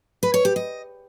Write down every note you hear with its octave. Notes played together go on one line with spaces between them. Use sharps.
B4
C#5
G4
D#5